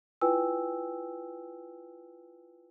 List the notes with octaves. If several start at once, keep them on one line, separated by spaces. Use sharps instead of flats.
E4 F4 B4 G5 G#5 E6